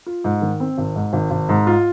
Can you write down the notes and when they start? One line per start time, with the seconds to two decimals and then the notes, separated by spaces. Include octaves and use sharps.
0.06 F4
0.24 G#2
0.42 D#3
0.60 C4
0.78 G#1
0.96 G#2
1.13 G#1
1.31 G#1
1.49 G#2
1.67 F4